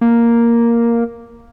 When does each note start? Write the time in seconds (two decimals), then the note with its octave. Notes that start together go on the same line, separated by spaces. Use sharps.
0.01 A#3